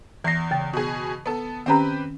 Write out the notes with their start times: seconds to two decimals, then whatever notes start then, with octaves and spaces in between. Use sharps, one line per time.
0.24 E2 E3 A#6 C7
0.51 C#3 G5 A6
0.73 B2 G#4
1.26 B3 A4
1.66 D#3 C4 C#4 G4 B4 A#5